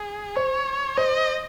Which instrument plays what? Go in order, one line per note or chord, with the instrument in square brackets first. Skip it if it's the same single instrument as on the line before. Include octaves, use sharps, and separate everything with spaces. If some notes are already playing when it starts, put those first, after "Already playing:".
Already playing: [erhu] G#4
[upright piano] C5 [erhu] C#5
[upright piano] C5 [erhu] D#5